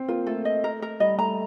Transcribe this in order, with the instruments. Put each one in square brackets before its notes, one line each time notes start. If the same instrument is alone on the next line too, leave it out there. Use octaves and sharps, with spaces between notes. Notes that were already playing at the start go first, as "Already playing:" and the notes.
Already playing: [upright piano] C4
[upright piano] A#3 [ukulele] F4
[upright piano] A3 [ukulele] A4
[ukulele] D#5
A#4
A#4
[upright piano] G3 [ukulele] D#5
[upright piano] A3 [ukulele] A#5